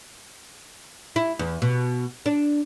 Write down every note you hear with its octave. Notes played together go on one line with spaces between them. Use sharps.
E4
E2
B2
D4